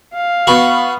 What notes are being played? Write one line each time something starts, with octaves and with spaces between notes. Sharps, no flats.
F5
B3 F#4 B5 C#6